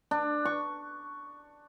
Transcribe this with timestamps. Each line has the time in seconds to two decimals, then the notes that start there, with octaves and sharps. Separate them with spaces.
0.11 D4
0.45 C#6